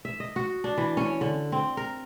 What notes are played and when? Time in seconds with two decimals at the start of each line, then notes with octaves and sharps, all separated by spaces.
0.05 E5
0.20 D#5
0.36 F#4
0.64 D4
0.78 E3
0.97 C#4
1.21 D3
1.52 C4
1.77 A#4